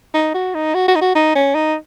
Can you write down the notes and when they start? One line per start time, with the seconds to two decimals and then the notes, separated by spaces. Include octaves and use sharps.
0.14 D#4
0.34 F#4
0.54 D#4
0.75 F#4
0.88 F#4
0.95 D#4
1.01 F#4
1.15 D#4
1.35 C#4
1.55 D#4